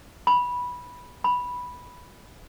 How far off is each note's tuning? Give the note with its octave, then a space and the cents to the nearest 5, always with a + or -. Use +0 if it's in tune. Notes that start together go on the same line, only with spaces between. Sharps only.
B5 -10
B5 -5